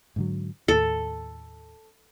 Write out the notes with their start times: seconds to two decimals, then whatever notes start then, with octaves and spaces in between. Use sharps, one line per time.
0.16 G#2 D3 F#3
0.68 D#2 A2 A4